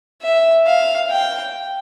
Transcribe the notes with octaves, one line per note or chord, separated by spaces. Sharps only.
E5
F5
G5